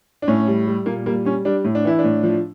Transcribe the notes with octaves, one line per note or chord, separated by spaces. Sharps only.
D4
A2 C#4
G3
G3
A#2 A#3
G3 A#3
G3 C#4
G3 D4
A2
D4
E3 E4
D4
A2
F3